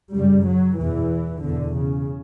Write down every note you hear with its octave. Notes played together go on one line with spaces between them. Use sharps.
F#2 C#3 G3
F#3
E2 B2 E3
E2 B2 D3
C#3